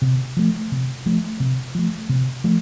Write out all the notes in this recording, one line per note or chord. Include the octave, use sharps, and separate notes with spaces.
C3
F3 A3
C3
F3 A3
C3
F3 A3
C3
F3 A3